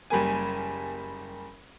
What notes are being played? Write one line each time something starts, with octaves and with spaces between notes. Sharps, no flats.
F#1 G3 A#3 G#5